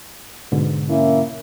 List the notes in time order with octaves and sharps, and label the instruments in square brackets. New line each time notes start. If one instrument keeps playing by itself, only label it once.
[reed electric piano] G#2 B2 D3
[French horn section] A#3 C#4 E4